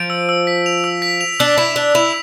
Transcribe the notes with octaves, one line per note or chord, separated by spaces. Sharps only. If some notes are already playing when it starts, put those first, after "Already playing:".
Already playing: F3 D7
E6
E6
B6
F7
E6
B6
F7
D4 E6
E4 B6
D4 F7
E4 F7